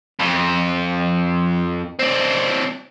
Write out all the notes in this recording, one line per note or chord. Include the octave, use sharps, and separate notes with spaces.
F2
C4 D4